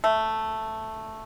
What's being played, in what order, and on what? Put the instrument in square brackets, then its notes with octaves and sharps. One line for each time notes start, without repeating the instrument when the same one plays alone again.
[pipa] A3